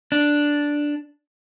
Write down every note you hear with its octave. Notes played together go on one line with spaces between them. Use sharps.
D4